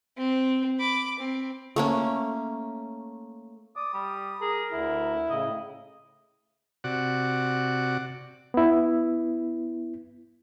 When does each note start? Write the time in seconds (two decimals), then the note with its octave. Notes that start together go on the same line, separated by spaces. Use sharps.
0.17 C4
0.79 B5 D6
1.19 C4
1.76 A3 A#3 C#4
3.76 D5 D#6
3.93 G3
4.41 G#4 A#4
4.72 D2 D3 E4
5.30 A2 C#3 D#5
6.84 C3 F#4 D5 F#5
8.54 B3 E4